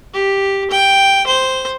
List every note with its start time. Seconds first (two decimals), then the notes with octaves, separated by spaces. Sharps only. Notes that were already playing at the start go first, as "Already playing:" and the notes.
0.14 G4
0.71 G5
1.27 C5